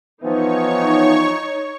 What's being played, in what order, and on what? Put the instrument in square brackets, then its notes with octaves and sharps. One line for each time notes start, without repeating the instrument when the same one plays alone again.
[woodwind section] E3 F3 B3 [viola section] D#4 [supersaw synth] C#5 C#6